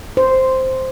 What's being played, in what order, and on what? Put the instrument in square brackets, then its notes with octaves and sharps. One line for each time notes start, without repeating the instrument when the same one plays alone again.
[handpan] C5